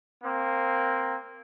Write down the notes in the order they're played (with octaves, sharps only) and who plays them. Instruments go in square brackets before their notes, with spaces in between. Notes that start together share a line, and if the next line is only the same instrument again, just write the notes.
[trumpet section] A#3 C4